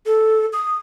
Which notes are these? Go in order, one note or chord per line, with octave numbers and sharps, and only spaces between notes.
A4
D#6